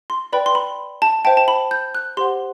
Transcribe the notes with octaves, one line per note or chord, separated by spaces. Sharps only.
C6
B4 D5 G5 B5
C6
B5
A5
C5 E5 G5 A5
A5
B5
G6
F#6
G4 C5 F#5 C6